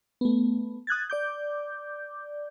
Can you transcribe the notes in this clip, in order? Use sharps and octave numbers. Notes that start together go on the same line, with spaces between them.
A3 B3
D#6 F#6 G#6 A6
D5 D6 G6